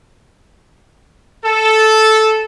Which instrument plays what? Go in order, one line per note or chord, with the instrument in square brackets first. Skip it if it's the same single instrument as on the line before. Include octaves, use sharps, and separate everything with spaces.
[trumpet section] A4